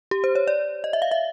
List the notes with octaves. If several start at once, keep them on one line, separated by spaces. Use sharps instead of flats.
G4
C5
C#5
D5
D#5
E5
F5
E5